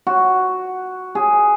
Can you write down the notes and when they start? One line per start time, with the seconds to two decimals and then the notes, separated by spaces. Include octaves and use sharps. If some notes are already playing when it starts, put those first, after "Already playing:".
0.07 F#4
1.15 G#4